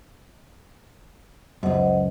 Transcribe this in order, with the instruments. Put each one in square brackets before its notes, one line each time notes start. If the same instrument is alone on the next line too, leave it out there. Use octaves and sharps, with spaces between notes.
[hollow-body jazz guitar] C#2 F#2 [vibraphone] C5 D#5 F#5